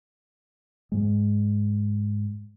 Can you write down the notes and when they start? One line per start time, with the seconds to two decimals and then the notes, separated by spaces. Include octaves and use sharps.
0.92 G#2 G#3